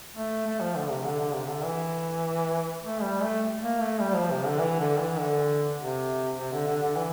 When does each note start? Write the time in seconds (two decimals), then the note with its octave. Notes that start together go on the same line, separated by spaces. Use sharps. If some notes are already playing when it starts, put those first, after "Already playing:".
0.16 A3
0.47 A3
0.60 F3
0.76 D3
0.90 C3
1.05 D3
1.20 D3
1.34 C3
1.49 D3
1.65 E3
2.83 A3
3.02 G3
3.23 A3
3.62 A#3
3.81 A3
4.01 G3
4.15 F3
4.31 C3
4.45 D3
4.60 E3
4.80 D3
5.00 E3
5.19 D3
5.79 C3
6.38 C3
6.52 D3
6.68 D3
6.83 D3
6.96 E3